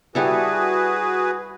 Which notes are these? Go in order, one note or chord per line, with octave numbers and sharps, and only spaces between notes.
G3 E4 F#4 G#4 A4 B4